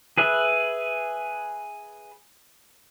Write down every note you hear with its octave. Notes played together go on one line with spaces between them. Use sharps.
G#4 B4 E5